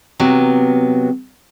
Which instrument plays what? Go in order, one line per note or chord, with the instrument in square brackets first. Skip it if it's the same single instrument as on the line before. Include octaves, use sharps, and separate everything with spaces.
[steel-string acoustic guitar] C3 F#3 B3